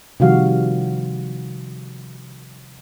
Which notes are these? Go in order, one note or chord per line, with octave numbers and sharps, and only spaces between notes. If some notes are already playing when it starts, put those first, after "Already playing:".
C3 D#3 F3 G3 F#4 F5